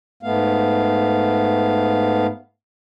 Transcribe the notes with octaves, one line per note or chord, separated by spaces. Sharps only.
G#2 A3 B3 F5